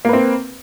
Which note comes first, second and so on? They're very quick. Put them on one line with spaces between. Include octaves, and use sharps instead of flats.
A#3 B4 C4